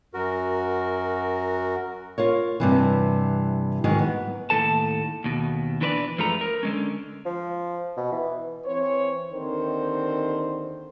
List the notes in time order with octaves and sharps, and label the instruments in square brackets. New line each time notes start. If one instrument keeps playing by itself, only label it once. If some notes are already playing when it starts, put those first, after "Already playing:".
[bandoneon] F#2 F#4 A#4
[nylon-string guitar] F4 A#4 C#5
G2 C3 E3
G#2 D#3 F#3
B3
[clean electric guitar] D#2 A2 F3 A4 A5
D#2 B2
E3 D4 B4 C5 D5
F#2 F3 G#3 A3 B4 A#5
A#4
D3 G#3 C#4
[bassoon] F3
B2
E3
[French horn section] E3 C4 C5 C#5
D#2 D3 D#3 C4 C5